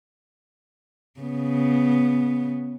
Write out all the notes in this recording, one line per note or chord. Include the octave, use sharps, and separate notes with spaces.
C#3 B3